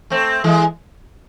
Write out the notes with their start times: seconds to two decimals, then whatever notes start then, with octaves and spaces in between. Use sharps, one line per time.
0.10 A3 C4
0.44 E3 G#3